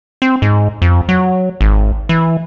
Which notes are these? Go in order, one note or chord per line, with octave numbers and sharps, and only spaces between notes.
C4
G#2
F2
F#3
G#1
E3